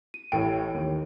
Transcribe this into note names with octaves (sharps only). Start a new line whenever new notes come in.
D#7
A1 A2 G5 D7
D#2 D#3